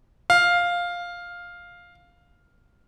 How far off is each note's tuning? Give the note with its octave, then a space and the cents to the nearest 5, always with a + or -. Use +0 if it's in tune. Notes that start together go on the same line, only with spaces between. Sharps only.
F5 +5